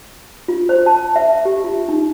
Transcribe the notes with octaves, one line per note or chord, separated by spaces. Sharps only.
F4
C5
A5
E5
G4
F4
D#4